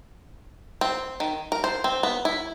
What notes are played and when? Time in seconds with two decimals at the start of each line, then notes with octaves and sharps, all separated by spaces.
0.81 C4
1.20 D#3
1.52 A#4
1.64 C5
1.84 C4
2.03 B3
2.25 E4